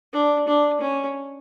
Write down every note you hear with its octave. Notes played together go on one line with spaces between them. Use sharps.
D4
D4
C#4